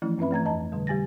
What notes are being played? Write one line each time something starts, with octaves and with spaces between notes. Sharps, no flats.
E3 F3 A3 C#4 E4
G2 C4 C#4 B4 E5 B5
E3 A3 A#5 G#6
F2 D#5 A5 A#5
B2 D3 G3
G3 G4 G#5 A6 A#6